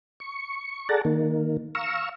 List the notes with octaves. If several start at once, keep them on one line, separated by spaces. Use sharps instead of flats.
C#6
G#4 A4 D5 F#5 A5 A#5
D#3 A#3
F5 A#5 C#6 E6